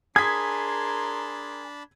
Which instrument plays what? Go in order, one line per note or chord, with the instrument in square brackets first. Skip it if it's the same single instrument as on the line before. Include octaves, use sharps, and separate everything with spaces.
[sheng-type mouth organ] D4 A5 B5 [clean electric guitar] G#4 [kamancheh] A#4 C6 [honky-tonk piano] G#6 B6